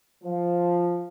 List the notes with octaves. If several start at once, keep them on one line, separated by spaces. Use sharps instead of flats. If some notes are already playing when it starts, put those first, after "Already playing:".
F3